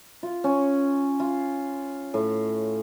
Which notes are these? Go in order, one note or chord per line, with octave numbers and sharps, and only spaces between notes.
F4
C#4
F4
A2